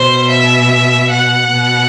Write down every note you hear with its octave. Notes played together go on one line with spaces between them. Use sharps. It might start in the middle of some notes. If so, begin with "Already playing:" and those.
Already playing: B2 C5
E5
F#5
B2